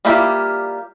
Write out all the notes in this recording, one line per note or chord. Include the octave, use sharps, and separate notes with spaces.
G3 A#3 E4 F4 G4